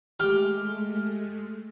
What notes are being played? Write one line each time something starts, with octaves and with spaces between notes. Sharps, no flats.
G#3 A3 G4 F6